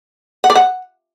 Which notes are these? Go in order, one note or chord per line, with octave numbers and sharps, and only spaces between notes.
F#5
D5
F#5